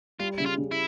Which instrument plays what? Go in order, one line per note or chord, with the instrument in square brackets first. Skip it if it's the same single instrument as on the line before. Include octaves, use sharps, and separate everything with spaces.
[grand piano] G3 [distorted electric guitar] F4
[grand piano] C#3 [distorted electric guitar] E4
[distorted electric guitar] F4
[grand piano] C#3
[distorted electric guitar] E4